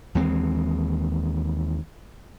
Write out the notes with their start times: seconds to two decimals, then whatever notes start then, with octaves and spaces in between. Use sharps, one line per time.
0.15 D#2 E3 G#3 C4